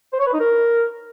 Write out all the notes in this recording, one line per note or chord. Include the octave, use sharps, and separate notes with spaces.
C5
C#5
B4
D#4
A#4